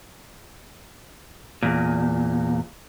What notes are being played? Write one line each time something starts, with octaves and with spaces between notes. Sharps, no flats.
E2 A#2